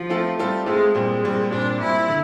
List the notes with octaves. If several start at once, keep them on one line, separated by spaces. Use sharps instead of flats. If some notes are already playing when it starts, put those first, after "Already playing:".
Already playing: F3
A3 C4 F4 A4
G3 A3 C4 F4 A4
G#3 A3 C4 F4 A4
A#2 G3 G#3 C4
A#2 G3 C4
A#2 G3 C4 D4
A#2 G3 C4 E4
D3